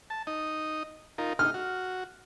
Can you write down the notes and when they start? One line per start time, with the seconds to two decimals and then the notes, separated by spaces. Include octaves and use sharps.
0.10 A5
0.27 D#4 D#5
1.18 D#4 F4 A#4
1.39 D#4 F6
1.54 F#4